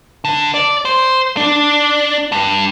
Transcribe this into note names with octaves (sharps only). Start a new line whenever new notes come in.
D3
D5
C5
D4
G2